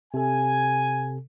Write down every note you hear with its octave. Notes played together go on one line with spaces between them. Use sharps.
C3 A4 G#5